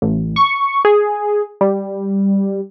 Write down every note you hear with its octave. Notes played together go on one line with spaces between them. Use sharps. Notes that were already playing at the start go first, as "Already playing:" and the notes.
A1
C#6
G#4
G3